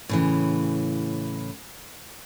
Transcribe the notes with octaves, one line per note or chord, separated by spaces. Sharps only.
A2 C#3 E3